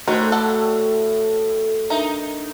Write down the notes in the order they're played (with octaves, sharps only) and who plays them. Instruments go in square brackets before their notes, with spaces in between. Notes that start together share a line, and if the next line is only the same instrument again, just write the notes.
[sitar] A2 [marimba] A3 [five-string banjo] D#4 A#4 C5 [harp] F#4
[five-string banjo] A4 D5 F#5
[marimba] D4 A#4 E5 [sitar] D#4 [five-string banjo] A#5